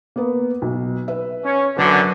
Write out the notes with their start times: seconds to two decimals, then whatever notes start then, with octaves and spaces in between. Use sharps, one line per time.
0.16 A#3 B3
0.62 B1
1.08 B4 E5
1.43 C#4
1.77 F#2 D3 F#3 F#4 B4